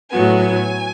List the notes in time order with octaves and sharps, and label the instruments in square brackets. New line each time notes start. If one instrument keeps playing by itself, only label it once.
[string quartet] A2 F#3 B3 G#5